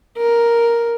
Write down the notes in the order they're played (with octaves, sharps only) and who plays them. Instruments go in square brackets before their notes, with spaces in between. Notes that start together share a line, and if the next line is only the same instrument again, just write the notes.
[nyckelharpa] A#4